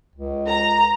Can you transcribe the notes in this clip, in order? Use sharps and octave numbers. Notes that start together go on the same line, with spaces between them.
C#2
A#5